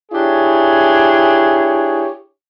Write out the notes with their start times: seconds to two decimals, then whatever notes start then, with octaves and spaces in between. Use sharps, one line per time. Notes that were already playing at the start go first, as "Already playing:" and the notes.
0.12 D4 E4 G4 G#4 C#5